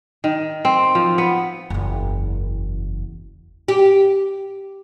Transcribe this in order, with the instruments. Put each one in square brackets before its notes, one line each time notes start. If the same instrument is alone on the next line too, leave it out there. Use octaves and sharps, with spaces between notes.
[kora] D#3
C4
F3
B3
[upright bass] F#1 E2
[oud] G4